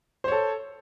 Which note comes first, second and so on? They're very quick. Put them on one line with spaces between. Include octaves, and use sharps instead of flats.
C5 C#5 A4